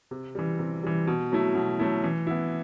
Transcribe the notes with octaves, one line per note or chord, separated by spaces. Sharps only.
C3
E3 G3
C3
E3 G3
B2
F#3 A3 E4
B2
F#3 A3 E4
E3
B3 E4